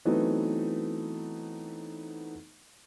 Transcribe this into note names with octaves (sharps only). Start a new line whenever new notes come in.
E3 F#3 A3 B3 C4 D#4